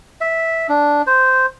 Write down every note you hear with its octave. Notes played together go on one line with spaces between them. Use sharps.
E5
D4
C5